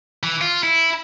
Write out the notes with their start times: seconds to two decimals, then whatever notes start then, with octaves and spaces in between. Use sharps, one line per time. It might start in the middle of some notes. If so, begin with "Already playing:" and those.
0.23 E3
0.41 F4
0.63 E4